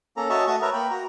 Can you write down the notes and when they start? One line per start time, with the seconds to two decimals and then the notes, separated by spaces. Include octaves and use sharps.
0.17 A#3 C#4 A4 A#5
0.30 F#4 C#5 D#5 E5 A5
0.48 A3 F#4 A5 C#6 D#6
0.62 A#4 B4 C#5 E5 A#5
0.73 A#3 G5 B5
0.90 F#4 A#5